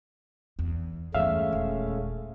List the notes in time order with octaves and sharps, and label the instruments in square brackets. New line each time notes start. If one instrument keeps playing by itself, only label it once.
[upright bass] E2
[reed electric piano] E2 E5 F5 [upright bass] G2 [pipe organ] G#3 A3 C#4
[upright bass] D#1